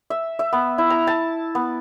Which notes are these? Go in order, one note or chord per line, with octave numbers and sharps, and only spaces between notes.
E5
E5
B3
E4
A#5
A5
B3